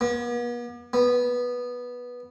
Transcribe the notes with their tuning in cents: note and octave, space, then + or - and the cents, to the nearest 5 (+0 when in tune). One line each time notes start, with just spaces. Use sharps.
B3 -45
B3 -10